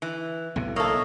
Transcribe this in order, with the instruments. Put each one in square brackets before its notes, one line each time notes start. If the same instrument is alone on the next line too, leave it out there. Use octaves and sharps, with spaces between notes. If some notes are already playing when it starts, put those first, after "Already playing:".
[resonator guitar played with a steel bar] E3
[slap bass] B1 A2 C3 [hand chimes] B3
[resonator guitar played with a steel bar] A#3 A4 [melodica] C#5 D#5 E5